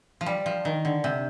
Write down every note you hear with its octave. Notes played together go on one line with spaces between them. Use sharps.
F3
G3
F3
D#3
D3
C3